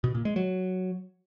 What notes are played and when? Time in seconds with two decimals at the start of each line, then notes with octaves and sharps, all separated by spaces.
0.04 B2
0.15 A#2
0.25 G#3
0.36 F#3